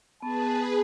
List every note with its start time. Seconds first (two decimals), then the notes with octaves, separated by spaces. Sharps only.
0.22 B3 G#4 B4 A5